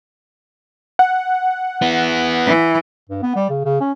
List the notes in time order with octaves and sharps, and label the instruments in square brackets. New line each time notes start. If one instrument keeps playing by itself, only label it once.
[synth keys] F#5
[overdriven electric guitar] B3 E4
[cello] E3
[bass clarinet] G2
B3
G3
C#3
C#3
C#4